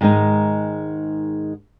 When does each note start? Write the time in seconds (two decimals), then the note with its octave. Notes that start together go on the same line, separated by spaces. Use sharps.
0.01 G#2 D#3 G#3 D#4